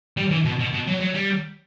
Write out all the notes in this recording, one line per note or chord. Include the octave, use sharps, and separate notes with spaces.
G3
E3
B2
B2
B2
F#3
F#3
G3